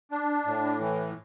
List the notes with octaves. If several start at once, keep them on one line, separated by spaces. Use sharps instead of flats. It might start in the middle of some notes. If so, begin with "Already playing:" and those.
D4
A2
E3